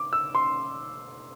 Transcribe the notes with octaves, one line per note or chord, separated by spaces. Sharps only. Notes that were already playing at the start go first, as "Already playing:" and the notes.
Already playing: D6
E6
C6